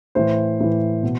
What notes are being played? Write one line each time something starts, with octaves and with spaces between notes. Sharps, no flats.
A2 E3 C5
A2 E3
B2